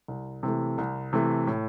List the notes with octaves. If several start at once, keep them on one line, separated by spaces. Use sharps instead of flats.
C2
C3 E3 A3
C2
C3 E3 A3
A2